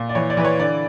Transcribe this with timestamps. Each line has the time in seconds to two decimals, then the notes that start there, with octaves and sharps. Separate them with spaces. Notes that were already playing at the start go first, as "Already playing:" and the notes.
Already playing: A#2
0.09 D5
0.15 E3 C#5
0.30 D5
0.37 E3 B4
0.45 C#5
0.59 D3 D5